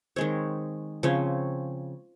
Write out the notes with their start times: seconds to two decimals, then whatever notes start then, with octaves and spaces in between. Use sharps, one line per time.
0.16 D#3 G#3 C4 C#5
1.03 C#3 F3 C4 C#5